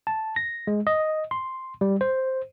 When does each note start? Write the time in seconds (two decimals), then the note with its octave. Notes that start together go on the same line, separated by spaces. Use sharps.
0.07 A5
0.36 A#6
0.67 G#3
0.87 D#5
1.31 C6
1.81 G3
2.01 C5